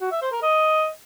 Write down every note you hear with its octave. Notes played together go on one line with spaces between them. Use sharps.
F#4
E5
C5
A#4
D#5